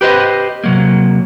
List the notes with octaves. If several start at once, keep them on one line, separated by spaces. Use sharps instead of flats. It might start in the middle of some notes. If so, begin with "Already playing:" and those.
G4 B4 C5 D#5
C3 F#3 A#3